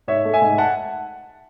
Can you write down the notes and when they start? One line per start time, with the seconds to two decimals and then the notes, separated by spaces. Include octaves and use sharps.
0.08 G#2 C#5 E5
0.25 A3
0.33 E5 G#5
0.42 G#2
0.58 F#5 A5